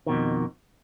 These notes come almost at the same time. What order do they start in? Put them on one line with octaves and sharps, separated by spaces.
D#3 B2 F2